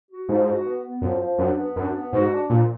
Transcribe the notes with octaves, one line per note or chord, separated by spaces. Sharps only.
F#4
G#2 F3
F#4
B3
B3
F#2 F3
F3
F#2 D4
B3
F#2 D4
B3
G#2 F#4
D4
A#2 F3